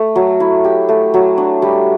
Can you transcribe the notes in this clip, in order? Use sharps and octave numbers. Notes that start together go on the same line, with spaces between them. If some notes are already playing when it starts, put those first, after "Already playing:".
Already playing: A3
F#3
E4
G4
A3
F#3
D4
G3